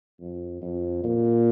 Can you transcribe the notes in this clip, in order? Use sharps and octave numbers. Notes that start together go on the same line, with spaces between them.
F2
F2
A#2